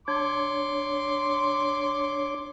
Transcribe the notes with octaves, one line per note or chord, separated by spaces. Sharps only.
D4 C#5 C6 D6